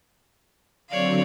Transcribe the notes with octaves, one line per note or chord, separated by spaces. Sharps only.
D3 F#3 C4 C#5 D5 F5